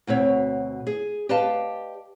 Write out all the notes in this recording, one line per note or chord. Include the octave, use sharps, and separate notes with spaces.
D2 B2 C4 C#5
G#4
G4 B4 D5 D#5 F5 A5